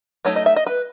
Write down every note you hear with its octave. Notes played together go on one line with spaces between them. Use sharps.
F#3 A3 D#4 C#5
D#5
E5
D#5
B4